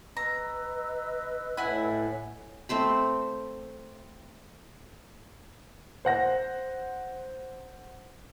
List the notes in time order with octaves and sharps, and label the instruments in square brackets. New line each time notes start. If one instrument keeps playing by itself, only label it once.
[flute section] B4 D#5 E6 [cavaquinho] A#5
[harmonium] A2 [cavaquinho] E4 F#5 G#5
[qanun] A3 C4 C5 B5
[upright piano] C5 F#5 A#6